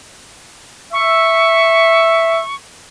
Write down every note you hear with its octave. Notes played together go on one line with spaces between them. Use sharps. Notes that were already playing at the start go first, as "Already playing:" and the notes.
E5 C#6